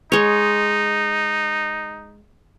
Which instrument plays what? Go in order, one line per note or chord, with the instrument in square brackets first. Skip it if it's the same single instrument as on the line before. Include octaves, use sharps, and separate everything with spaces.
[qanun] G#3 C#5 [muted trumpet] D#4